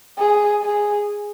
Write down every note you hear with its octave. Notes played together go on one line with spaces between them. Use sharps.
G#4
G#4